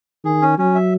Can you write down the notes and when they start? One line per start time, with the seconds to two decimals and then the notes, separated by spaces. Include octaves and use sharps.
0.24 D#3 G#4
0.42 C#4
0.58 F#3 C#4
0.75 E5